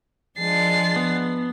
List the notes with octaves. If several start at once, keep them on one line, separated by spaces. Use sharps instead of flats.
F3 G#3 D4 A6 C7
B3